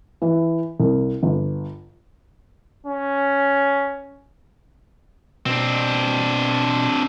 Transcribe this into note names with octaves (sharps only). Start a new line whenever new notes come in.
E3
C2
G1
C#4
B2 C4 D4